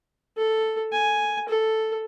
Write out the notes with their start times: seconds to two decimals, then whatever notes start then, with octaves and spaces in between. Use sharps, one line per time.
0.37 A4
0.93 G#5
1.49 A4